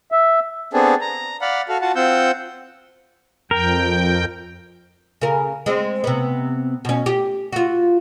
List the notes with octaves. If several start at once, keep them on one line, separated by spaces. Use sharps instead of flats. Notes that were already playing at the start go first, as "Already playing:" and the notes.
E5
B3 C4 D4 G#4 A4
A#5
D5 F5 F#5 B5
F#4 A4 F5
F4 F#4 F#5 A5
C4 F4 F#5 E6 G6
F2 A#4 G5
C#3 A#4
G#3 C4
C3 B3
B2 C#4
G4
F4 F#4